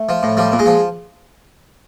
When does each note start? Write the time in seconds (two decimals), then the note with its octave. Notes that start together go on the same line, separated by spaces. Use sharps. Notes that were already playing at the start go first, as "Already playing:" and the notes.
Already playing: A3
0.09 F3
0.23 A2
0.37 F3 G3
0.52 A#2
0.59 G#3
0.66 F3